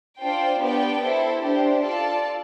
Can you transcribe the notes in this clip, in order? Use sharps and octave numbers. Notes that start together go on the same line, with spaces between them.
D4 F4 C5 G5
B3 D4 G4 D5 G5
E4 A4 C5
D4 G4 C5
F4 A4 D5 A5